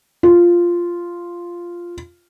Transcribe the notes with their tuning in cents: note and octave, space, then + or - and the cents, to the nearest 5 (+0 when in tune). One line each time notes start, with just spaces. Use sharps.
F4 -5